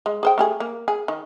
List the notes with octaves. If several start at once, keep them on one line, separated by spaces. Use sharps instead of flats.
G#3
G#4 C5 G5
A3 G4 G#4
A#3
G#4
D#3